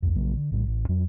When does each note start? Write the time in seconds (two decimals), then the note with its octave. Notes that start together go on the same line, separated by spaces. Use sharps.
0.02 C2 F2
0.15 A#1 C#3 F#3 A#3
0.37 D3
0.51 A#1 A2 F3 G3
0.67 A1
0.88 F2 F#3